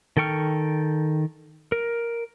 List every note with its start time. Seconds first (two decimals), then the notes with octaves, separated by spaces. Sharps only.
0.17 D#3 A4 G5 C#6 F6
1.72 A#4